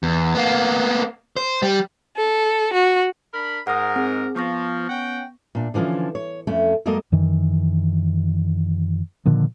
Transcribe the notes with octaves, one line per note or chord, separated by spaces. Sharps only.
E2
A#3 B3
C5
G3
A4
F#4
D4 A#4 B5
G#2 A#4 F#5 D#6
C4 G#4
F3 B3 C#6 A#6
C#4 F#5 G5
A#2 D4
D3 E3 F3 C#4 F4
C#5
F2 A3 C#4
F#2 G#3 A#3 A4 A#4 D#5
F#2 D#3 E3
A#2 D3 D#3 F3